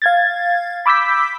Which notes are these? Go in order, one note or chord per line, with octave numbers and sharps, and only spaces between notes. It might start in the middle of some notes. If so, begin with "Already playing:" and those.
F5 G#6 A6
B5 D6 E6 G6 B6